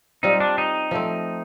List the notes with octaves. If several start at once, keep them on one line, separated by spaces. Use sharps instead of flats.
G3 C4 D#4 F4
D4
D#4
F3 A3 C4